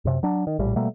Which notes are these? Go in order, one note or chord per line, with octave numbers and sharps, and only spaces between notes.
F#2 C3
F#3 D4
D#3
A#1 A2 G3
B2 G3 A3 A#3